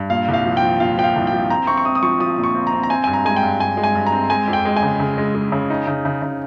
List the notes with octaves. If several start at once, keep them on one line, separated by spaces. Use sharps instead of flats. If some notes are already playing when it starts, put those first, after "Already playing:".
Already playing: G2
A#2 F5
C2
F5
F3
G5
F3
A#2 F5
F3 G5
F5
C2
G5
F3
C4 A#5
C4 C#6
C#6
C4 D#6
D#6
F3 C#6
F3 D#6
A#2
C#6
C4
A#5
C4
A#5
C4 G#5
G2 G#5
A#5
G#3 G#5
G5
G2
G2 G#5
G#3
G#5
G2
A#5
C4
G#3 G#5
F2
G5
G#3
G#5
C#3
C#3
G#3
G#3
C#3
D#4
C#3
C#3
C#3